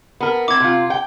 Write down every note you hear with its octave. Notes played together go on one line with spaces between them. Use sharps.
B3 A#4
C4 E4 D6 G#6
C3 F4
G5